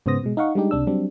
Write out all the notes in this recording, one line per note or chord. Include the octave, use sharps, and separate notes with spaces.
G#2 C#3 B3 C5 D#6 A#6
B2 G#3
D#4 D#5 F5 F#5 C#6
G3 G#3 D4 D#4 G4
C#2 C3 D4 E6
F#3 G3 C4 D4